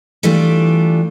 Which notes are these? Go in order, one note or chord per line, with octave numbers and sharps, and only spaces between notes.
E3 G3 A3 D4 F4